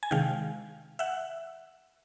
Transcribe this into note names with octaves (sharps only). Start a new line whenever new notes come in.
G#5
C3 D#3 G#3 F5 G5
E5 F#5